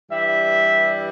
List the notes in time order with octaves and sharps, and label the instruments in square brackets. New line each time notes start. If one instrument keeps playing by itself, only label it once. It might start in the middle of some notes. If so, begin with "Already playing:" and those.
[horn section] G2 E3 G3 E5